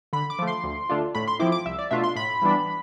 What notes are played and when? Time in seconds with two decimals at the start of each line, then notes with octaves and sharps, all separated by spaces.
0.13 D3 B5
0.30 D6
0.39 F3 A3
0.47 C6
0.64 D2
0.89 D3 A3 D4 F4
1.15 A2 B5
1.28 C6
1.39 F3 C4 E4 D6
1.52 D6
1.65 C2 E5
1.78 D5
1.91 B2 A3 D4 F4 E5
2.03 C6
2.16 A2 B5
2.42 E3 G3 B3 D4